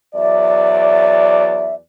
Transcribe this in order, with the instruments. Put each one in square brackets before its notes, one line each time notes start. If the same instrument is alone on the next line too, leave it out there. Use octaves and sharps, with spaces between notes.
[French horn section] E2 F#3 D5 [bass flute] E5